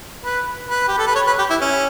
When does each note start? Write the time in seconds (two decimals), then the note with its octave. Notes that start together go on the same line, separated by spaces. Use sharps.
0.24 B4
0.69 B4
0.88 G4
0.98 A4
1.07 B4
1.15 C#5
1.27 B4
1.38 G4
1.50 E4
1.61 C#4